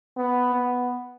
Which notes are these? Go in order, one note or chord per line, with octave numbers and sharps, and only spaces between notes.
B3
B3